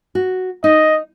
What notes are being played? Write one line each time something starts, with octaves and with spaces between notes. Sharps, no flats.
F#4
D#4 D#5